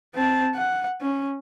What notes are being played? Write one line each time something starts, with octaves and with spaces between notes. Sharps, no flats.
C4 A5
F#5
C#4